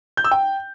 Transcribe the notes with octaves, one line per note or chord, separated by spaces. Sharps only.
G6
E6
G5